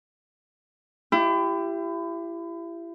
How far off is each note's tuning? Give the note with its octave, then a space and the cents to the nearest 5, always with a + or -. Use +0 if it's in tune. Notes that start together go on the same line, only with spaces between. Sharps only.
E4 +35 G4 +0